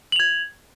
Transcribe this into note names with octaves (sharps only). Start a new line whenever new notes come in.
G#6 F7 F#7